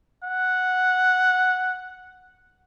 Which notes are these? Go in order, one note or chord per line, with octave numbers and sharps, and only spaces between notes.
F#5